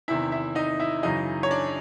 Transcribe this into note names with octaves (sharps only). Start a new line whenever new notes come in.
E2 C3 D#3 E4 E5
E4 E5
D#4 D#5
E4 E5
F#2 C#3 E3 D#4 D#5
C#5
D4 D5